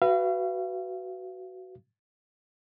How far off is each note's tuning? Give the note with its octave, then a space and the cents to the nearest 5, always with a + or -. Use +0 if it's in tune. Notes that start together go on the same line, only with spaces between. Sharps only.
F#4 +10 B4 +0 F5 -40